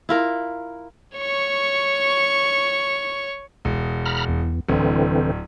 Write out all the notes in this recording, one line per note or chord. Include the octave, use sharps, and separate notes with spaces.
E4 F4 A#4
C#5 C#6
E1
A#5 B5 F6
E2
D1 D3 E3 C4